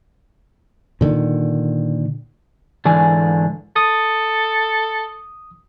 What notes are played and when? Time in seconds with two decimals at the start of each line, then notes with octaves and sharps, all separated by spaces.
1.01 A#2 D3 D#3
2.85 G#2 D3 E3 D5 G#5
3.76 A4 D#6